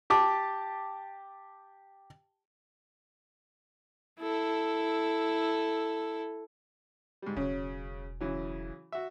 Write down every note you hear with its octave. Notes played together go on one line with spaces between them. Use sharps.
G4 A5 D6
E4 A4
G#2 G3
E1 C#3 F#3 C#4
C#3 E3 F#3
F#4 E5